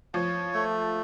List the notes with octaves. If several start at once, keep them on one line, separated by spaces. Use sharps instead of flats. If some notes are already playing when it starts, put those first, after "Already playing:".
F3 C#5
A3